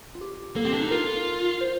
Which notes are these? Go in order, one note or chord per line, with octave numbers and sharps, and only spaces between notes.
F4
G4
A#3 A4
C4 G4
D4 A4
D#4
F4 A#4
C5